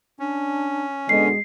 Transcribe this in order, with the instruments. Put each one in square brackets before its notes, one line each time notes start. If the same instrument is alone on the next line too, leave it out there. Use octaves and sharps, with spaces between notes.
[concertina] C#4 [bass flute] D4
[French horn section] B2 D3 D#5 [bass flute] G#3 [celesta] C7